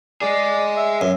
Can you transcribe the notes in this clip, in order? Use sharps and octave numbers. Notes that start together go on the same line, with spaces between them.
G#3 G#4 D5
E5
F#2